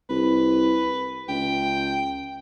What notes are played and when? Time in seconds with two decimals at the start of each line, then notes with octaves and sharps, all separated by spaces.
0.10 C2 B4
1.29 C#2 G5